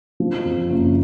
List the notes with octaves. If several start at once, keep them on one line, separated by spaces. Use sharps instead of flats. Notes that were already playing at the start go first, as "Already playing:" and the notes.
F3
F2
F#1